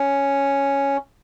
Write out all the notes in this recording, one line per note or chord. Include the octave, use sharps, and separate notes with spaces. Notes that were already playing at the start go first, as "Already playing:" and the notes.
Already playing: C#4